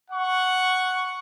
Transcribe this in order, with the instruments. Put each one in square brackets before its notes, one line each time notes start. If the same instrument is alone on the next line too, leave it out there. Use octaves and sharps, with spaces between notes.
[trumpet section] F#5 C#6